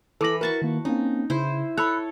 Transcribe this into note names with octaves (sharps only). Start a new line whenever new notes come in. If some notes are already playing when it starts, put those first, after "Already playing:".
E3 A4 B5 D6 A#6
F#4 A#4 A5 C#6 A6
D#3 A#3
A#3 C4 C#4 D#4
C#3 E4 C5
A4 C#5 B5 E6 F#6